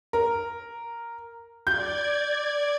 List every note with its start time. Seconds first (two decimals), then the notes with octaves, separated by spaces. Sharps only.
0.13 A#4
1.67 D5 G6 G#6